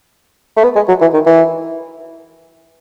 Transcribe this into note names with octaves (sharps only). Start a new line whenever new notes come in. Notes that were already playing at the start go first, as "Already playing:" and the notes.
A3
B3
G#3
F#3
E3
D#3
E3